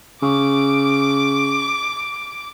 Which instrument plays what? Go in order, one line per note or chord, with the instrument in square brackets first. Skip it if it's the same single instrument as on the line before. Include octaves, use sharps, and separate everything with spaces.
[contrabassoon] C#3 [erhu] D6